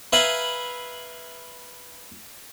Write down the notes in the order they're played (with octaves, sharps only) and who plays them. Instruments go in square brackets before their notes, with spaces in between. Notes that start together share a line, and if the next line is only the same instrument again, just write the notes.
[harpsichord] B4 E5 F5 G#5 A#5 B5